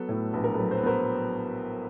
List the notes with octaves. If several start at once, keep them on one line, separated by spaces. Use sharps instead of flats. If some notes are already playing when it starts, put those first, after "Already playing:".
Already playing: F#3 B3 A4 B4
A2
A#1 B4
A#4
F#3 A4 B4
C5
B4
B3 A#4 C5